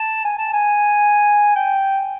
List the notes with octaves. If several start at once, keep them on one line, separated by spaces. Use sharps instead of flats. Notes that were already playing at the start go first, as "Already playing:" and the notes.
Already playing: A5
G#5
A5
G#5
G5